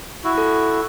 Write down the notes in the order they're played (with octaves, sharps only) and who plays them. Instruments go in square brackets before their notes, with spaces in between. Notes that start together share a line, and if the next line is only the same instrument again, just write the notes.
[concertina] E4 F#4
[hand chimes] A4